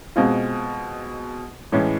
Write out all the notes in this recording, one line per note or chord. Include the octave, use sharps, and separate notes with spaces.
B2 G#3 C4 F4
A2 E3 G#3 C#4